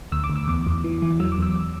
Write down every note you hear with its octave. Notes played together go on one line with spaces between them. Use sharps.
D2 E6
D6
D2
E6
E2 D6
E2
E3
E3
F#3 E6
D6
E2 E6